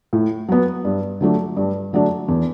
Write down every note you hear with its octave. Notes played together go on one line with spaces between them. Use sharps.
A2
F#3 B3
G2
D3 F#3 A3 D4
G2
D3 F#3 A3 D4
E2